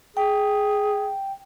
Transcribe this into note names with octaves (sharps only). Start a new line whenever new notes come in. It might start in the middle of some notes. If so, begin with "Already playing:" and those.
G#4 G5